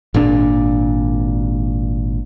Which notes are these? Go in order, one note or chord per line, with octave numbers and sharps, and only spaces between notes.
G#1 A#2 D4